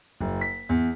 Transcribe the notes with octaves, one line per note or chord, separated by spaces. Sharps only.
F#1
B6
E2